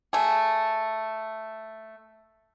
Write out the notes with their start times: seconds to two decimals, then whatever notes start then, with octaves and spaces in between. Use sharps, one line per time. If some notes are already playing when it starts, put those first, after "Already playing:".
0.13 A3 G#4